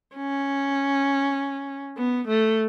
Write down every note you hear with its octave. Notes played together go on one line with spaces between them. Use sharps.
C#4
B3
A3